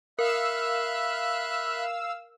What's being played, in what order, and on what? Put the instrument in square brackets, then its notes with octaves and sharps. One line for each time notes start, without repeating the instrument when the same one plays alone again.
[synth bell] A#4 [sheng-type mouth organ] E5 B5 F#6 [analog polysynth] F5 E6